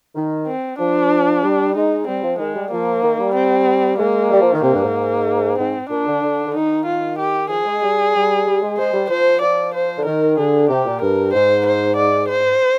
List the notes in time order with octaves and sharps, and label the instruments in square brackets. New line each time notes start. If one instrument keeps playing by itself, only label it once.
[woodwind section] D#3
[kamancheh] C4
[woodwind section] F3 [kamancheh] D4
[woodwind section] G3
[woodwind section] G#3 [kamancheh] D#4
[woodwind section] G3 [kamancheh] C4
[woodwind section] F3
[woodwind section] D#3 [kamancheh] G#3
[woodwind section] G3
[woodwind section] F3 [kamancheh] A#3
[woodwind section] D#3
G3
[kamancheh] C4
[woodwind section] G#3 [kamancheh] A#3
[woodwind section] G3
F3
D#3
[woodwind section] C3 [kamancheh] A#3
[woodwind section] G2
G#2
[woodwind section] G#2 [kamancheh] C4
[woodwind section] A#2 [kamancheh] D4
[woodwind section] D3
D3
D3
[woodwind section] D#3 [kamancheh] D#4
[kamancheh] F4
G4
[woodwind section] F3 [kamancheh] G#4
[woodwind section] G#3
G3
G3
G3
G#3
[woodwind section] G#3 [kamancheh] C5
[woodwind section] G3
[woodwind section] F3 [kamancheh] C5
[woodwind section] F3 [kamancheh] D5
[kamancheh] C5
[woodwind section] D3
[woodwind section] D#3 [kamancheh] A#4
[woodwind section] D3 [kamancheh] G#4
[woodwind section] C3 [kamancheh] G4
[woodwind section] A#2
[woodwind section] G2 [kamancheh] A#4
[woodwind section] G#2 [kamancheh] C5
[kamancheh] C5
D5
C5